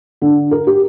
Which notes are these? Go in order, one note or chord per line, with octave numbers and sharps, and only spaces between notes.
D3
A#4
G4